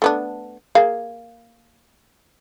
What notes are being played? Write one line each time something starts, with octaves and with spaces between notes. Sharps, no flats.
A3 B3 D4
A#3 G#4 F5